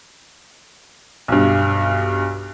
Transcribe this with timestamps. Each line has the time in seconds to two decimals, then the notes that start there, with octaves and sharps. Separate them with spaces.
1.28 B1 G2